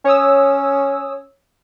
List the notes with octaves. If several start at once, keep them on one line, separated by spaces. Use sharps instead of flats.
C#4 C#5 D#6 E6